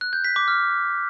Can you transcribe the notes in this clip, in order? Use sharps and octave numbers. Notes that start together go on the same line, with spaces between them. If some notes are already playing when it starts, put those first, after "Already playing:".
F#6
G6
B6
D6
F6